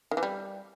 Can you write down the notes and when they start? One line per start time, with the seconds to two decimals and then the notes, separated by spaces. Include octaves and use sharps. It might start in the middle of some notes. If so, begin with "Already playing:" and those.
0.11 D#3
0.17 E3
0.23 G3